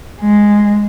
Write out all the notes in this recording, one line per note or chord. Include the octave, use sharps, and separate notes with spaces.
G#3